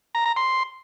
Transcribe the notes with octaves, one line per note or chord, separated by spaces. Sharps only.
A#5
A#5
C6